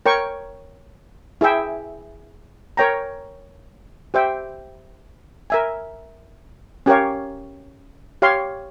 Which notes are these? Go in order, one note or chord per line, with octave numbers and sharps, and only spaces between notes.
A#4 C#5 G5 C#6
E4 G#4 E5 G5
A#4 C#5 G5 A#5
G4 C5 E5 G5
A#4 E5 G#5
C#4 G4 A#4 C#5 F5
G4 C#5 F5 C6